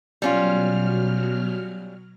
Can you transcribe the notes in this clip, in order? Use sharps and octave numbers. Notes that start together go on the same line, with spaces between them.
B2 F#3 G3 C#4 F4 F6